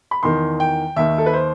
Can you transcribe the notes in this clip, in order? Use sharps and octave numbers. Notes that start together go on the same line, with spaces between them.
B5
E2 D#3 C6
G5
D#2 D#3 E5
A4
B4
C5